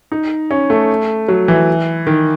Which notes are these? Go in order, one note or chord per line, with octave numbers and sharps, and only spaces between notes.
D#4
C#4
A3
F#3
E3
D#3